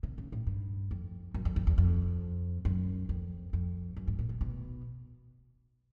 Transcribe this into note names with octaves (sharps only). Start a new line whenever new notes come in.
C3
C#3
A2
G2
F2
F#2
F2
F2
E2
F2
F#2
F2
F2
F#2
G#2
A#2
B2
B2